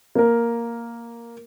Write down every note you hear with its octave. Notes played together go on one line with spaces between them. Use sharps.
A#3 A#4